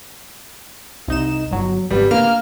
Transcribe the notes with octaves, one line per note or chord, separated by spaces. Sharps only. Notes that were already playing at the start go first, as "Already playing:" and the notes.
C2 D#4 E7
G1 F#3
G#1 G3 B3
A#3 F6